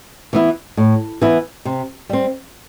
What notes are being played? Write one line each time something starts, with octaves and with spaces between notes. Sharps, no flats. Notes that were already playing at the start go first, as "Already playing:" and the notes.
E3 B3 E4
A2
E3 B3 E4
C3
G3 C4